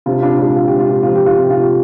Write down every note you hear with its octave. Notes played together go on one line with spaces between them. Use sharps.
C3 D4 F4
D4 F4
G#3 D4
F4
C3 G4
F4
G4
F3 F4
G4
F4
C3 G4
F4
G4